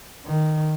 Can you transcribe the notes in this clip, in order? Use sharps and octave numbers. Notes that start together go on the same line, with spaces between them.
D#3